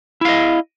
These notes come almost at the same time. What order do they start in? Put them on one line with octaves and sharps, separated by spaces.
E4 F5 D#5